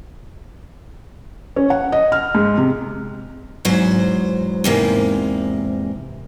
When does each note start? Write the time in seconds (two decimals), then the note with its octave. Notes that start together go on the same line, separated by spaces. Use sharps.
1.56 C#4
1.70 F#5
1.92 D#5
2.12 F6
2.35 G#2
2.58 C3
3.65 E2 G#2 F#3 C5
4.64 E2 G#2 C3 A#3